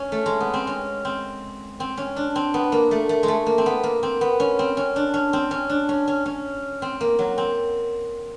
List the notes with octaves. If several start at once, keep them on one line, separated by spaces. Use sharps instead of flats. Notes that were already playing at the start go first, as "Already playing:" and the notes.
Already playing: C#4
A3
G#3
B3
C4
C#4
C4
C4
C#4
D4
C4
B3
A#3
A3
A3
G#3
A3
A#3
C4
B3
A#3
C4
B3
C#4
C4
C#4
D4
C#4
C4
C#4
D4
C#4
C#4
C#4
C4
A#3
F#3
C4